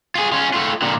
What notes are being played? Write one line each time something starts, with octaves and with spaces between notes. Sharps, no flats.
F4 G#4
C#4 F4
A3 F4
A#2 D3